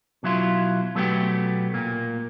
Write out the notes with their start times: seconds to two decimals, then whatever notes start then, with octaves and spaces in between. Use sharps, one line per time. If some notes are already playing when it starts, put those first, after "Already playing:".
0.23 B2 F#3 E4 F4
0.95 B2 F#3 A3 B3 F#4 G4
1.74 A#2 A#3